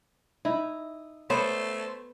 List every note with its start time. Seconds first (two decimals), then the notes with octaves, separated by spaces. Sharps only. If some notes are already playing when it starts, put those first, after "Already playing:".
0.45 D#4 E4
1.30 A3 B3 C5 C#5